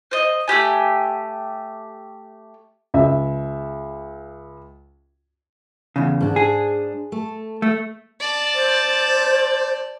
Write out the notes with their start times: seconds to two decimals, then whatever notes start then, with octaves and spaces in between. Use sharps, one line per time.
0.11 C5 D#5
0.48 A3 F#4 G4 G#5
2.94 C#2 E5
5.96 E2 C#3
6.21 G#2 D4
6.36 G#4
7.12 A3
7.62 A3
8.20 D5 A5
8.55 C5